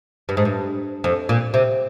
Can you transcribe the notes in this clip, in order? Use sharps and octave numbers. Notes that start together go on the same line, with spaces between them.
G2
G#2
G2
F2
A#2
C3